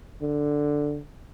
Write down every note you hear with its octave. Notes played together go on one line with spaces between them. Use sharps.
D3